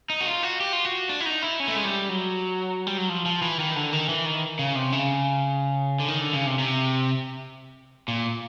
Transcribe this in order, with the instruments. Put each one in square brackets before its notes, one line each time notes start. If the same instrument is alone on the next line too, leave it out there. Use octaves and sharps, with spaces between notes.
[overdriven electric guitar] D#4
F#4
F4
F#4
G4
F4
F#4
D4
E4
D#4
E4
C#4
A3
G#3
G3
F#3
G3
F#3
F3
F3
E3
D#3
D3
D#3
E3
D#3
C#3
C3
C#3
D3
D#3
D3
C#3
C3
C3
A#2